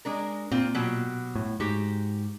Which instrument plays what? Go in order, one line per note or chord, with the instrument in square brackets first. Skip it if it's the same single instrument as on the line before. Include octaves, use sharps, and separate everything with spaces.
[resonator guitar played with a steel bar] G#3 D4 A#4
[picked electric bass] A#2 [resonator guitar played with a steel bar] C4 F4
[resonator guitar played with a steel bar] B2 F#3 G4
[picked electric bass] A2
[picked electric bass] G#2 [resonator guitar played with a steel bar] F#4 G4